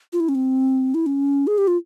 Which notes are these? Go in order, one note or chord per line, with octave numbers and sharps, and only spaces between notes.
F4
E4
C#4
C4
E4
C#4
G#4
G4
F4